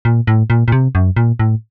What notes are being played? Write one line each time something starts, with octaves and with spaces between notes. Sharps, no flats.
A#2
A2
A#2
A#2
C3
F#2
A#2
A2